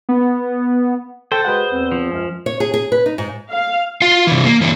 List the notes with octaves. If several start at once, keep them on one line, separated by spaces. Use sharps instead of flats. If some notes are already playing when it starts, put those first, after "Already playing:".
B3
A4 C5 G5 A6
G#3 F#4 G#4 B4 F#5
E2 C4
F3
C#2 F#2 C#4
C#5
G#4
G#4
B4
D#4
G#2
F5
F4 F5
C3 E3
A#3
E3 A#3